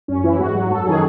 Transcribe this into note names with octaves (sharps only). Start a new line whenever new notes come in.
F#2 C#4
E3 E4
G#2 F#4
F#3
F#2 A4
D#3 F#3 G#4